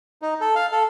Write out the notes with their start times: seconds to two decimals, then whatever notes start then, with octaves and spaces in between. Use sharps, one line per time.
0.22 D#4
0.41 A4
0.55 F5
0.72 A4